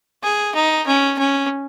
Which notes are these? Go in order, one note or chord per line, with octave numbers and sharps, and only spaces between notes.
G#4
D#4
C#4
C#4